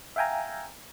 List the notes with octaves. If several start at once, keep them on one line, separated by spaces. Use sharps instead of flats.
E5 F5 G5 G#5 A#5